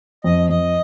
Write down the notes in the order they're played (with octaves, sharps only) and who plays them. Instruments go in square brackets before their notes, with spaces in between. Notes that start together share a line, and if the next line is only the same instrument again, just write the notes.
[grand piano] F2 [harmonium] D#5
[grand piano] F2 [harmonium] D#5